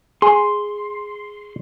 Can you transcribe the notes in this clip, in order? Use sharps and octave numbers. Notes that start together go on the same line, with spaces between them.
G#4 C6